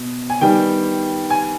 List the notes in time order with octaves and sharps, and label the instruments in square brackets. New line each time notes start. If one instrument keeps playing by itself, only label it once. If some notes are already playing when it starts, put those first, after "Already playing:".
Already playing: [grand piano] B2
[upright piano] G#5
[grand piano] D#3 G3 B3 [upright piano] G5
[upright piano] G#5